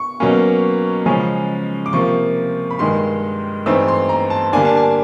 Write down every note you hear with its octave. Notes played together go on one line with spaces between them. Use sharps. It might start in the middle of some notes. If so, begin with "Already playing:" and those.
Already playing: C#6
B2 F#3 A#3 C#4
C#3 F3 G#3 C#4
D6
C3 F3 A#3 C#6
B5
G2 D#3 G#3 C6
G2 E3 A3 C4 D#4 E6
C6
A#5
A5
D3 G3 A#3 D4 G#5
A5
G#5